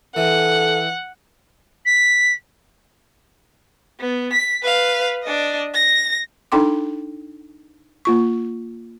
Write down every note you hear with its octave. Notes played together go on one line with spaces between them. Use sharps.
E3 A4 F#5
B6
B3
B6
B4 F5
D4 D#5
A#6
D4 D#4 A4 G5 C6 D6
A#3 F4 C#6